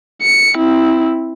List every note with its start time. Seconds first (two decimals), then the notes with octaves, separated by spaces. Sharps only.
0.23 C#7
0.57 C4 E4